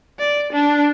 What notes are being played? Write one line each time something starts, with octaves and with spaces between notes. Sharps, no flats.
D5
D4